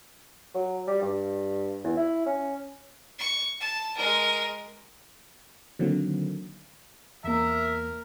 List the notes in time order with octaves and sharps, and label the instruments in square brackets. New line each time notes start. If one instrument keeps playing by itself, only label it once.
[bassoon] F#3
G3
G2
E2
E4
C#4
[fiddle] C#6
A5
G#3 A#4
[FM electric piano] D3 D#3 F#3 A#3 C4
[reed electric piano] E2 A#3 [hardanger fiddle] A#4 [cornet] E5